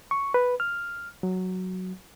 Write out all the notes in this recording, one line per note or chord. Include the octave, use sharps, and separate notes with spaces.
C#6
B4
F6
F#3